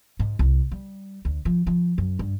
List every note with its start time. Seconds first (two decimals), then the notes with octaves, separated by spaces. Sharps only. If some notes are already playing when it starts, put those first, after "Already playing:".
0.19 G#2
0.39 C2
0.71 G3
1.25 D2
1.45 F3
1.67 F3
1.98 F#2
2.19 G2